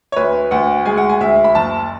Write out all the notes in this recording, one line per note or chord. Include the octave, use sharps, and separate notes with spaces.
C#5
D2 B4
D2 F#5
G#3 G#5
F#5
G#5
D2 E5
B5
F#1 A5